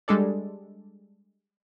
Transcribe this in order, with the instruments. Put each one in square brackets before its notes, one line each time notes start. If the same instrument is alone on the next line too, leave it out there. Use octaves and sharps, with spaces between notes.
[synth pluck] G3 G#3 D4 A4 D5